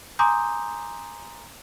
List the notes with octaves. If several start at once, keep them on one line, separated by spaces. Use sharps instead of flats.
G#5 A#5 C6 D6 D#6 G6